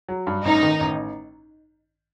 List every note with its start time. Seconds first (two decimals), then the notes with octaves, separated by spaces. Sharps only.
0.09 F#3
0.27 G2
0.45 A1 D#4
0.63 D#3
0.80 A1